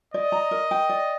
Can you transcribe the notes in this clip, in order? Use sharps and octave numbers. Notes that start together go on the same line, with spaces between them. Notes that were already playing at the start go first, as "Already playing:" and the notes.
D5 D#5
A#5
A#4
G5
D5